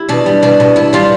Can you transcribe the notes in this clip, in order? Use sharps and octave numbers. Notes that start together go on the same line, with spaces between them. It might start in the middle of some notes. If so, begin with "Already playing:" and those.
Already playing: E4 G4
B2 D4
G3
B2 D4
B2
B2 E4
G3 D4 F4